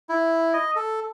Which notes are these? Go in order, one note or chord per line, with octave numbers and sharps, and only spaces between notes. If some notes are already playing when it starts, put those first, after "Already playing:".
E4
D#5
A4